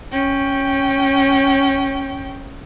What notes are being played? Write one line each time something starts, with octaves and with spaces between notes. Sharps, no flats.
C#4 G5